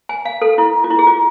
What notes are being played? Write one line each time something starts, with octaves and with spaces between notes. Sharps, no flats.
G#5
F5
A4
E4
F4
E4
G#4
F4